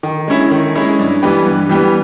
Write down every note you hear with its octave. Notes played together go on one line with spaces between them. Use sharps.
D#3
G#3 C#4 E4
D#3
G#3 C#4 E4
G2
E3 G3 B3 G4
G2
E3 G3 B3 G4